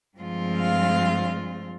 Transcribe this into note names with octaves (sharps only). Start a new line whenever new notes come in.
G2 F3 G#3 C4 F4
F5